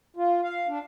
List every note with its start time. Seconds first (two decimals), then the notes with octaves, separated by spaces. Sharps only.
0.16 F4
0.43 F5
0.68 D4